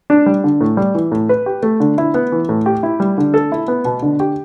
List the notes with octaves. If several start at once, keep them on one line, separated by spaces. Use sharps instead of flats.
D4
G3
D3
A2
G3
E3
A2
B4
G4
A3
D3
E4
B3
E3
A2
G4
E4
G3
D3
A4
E4
B3
B2
D3
G4